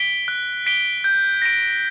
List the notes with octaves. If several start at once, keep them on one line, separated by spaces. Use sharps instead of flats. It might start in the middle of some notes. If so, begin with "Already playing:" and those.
Already playing: B6 D7 G7
F#6
B6 D7 G7
G6
A#6 D7